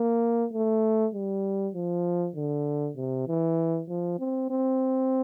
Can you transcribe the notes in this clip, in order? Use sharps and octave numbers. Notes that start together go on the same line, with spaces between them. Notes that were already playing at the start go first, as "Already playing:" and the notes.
Already playing: A#3
A3
G3
F3
D3
C3
E3
F3
C4
C4